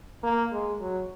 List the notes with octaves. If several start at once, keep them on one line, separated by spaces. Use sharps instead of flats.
A#3
G#3
F#3